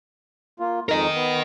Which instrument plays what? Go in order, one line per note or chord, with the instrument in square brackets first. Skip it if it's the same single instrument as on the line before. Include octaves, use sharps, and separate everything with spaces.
[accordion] A#3 F4
[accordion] F2 G#3 D#4 [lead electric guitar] A#4 D#5
[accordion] B3